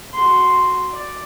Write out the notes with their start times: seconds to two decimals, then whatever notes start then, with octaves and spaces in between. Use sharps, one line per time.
0.14 F#4 C6
0.92 D5